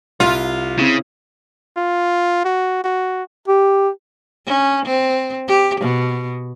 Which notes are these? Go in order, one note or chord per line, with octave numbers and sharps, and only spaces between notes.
C2 F4
C#3 C4 E4
F4
F#4
F#4
G4
C#4
C4
G4
B2